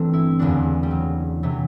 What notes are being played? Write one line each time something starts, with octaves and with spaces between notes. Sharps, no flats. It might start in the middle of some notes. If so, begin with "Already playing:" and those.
Already playing: G1 G2 E3 A3 C4 D4
E4
F#1 E2 D3 D4
G3
F#3
C3 E3 F#3